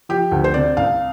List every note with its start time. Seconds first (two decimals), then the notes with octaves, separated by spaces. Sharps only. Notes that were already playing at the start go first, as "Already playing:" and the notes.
0.09 F3 G4
0.31 D2
0.44 C5
0.54 C3 D5
0.77 C2 F5